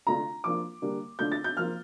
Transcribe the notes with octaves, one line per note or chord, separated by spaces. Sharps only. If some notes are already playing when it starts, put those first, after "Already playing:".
D3 A3 D4 F4 A#5
F3 A#3 D4 F4 D6
D3 G3 A#3 D4
D3 A3 D4 F4 G6
A6
G6
F3 A#3 F4 F6